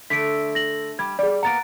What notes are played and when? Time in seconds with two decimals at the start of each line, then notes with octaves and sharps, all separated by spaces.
0.10 D3 A3 B6 D7
0.55 A#6 F#7
0.99 G3 G#6
1.19 G3 G#4 D5
1.43 A#3 B3 F#5 A#5 A6 D7